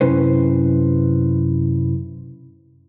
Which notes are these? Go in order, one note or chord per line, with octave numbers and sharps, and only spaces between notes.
F#2 C3 C#4 E4 B4 C5